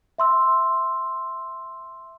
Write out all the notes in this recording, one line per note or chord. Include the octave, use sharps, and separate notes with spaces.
E5 C6 E6